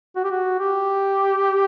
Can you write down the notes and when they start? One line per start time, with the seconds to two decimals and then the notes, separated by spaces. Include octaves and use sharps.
0.15 F#4
0.24 G4
0.31 F#4
0.59 G4